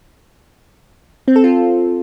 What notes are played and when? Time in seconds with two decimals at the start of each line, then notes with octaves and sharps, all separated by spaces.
1.28 C4
1.36 A4
1.44 F4